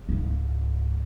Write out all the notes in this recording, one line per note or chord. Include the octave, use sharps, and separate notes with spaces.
C#2 G#2